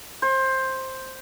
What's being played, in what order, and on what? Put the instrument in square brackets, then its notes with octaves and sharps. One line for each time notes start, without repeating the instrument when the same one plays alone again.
[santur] C5